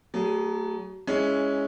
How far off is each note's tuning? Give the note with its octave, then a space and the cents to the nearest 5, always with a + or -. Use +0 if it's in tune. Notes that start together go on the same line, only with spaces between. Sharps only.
F#3 +40 A3 +35 G#4 -10
G#3 +0 C#4 +10 E4 +0